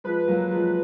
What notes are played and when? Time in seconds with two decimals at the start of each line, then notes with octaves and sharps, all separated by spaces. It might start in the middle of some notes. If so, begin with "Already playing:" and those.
0.04 F3 G#3 B4
0.28 F#3 A#3
0.51 F3 G#3